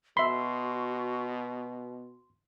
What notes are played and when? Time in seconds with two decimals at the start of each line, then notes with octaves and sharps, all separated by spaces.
0.17 B2 F#4 E5 B5 C6